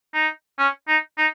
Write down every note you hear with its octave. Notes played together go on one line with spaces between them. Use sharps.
D#4
C#4
D#4
D#4